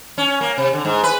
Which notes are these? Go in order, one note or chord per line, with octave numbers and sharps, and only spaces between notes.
C#4
A#3
C3
D3
G#2
B4